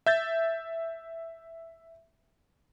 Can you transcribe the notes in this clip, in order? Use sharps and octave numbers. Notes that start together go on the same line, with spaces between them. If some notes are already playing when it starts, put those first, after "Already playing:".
E5 G6 A6